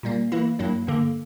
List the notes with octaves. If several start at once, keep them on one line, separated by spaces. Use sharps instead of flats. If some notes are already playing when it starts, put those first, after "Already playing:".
A#2 G3 A#3
E3 A#3 E4
G2 F#3 A#3 E4
G2 D3 A#3